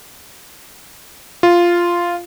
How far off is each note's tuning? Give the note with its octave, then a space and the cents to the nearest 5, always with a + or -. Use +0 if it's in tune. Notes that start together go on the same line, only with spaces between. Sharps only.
F4 -5